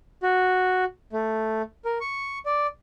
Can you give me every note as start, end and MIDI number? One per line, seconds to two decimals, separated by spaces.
0.23 0.84 66
1.13 1.62 57
1.85 1.98 70
2.01 2.39 85
2.46 2.67 74